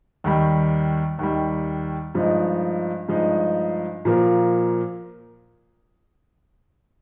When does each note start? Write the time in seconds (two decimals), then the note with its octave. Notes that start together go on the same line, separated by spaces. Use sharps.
0.24 D#2 D#3 G3
1.19 D#2 D#3 G3
2.15 G2 F3 G#3 D#4
3.08 G2 F3 G#3 D#4
4.05 A#2 F3 A#3